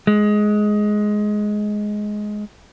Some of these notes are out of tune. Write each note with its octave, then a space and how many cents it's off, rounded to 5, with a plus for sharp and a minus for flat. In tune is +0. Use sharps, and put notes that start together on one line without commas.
G#3 +10